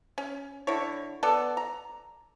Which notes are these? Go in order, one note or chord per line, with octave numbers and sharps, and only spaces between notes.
C#4
D3 E4 C#5
B3 A4 D5
A#5